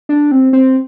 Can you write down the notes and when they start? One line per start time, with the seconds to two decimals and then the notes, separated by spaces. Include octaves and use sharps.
0.09 D4
0.32 C4
0.53 C4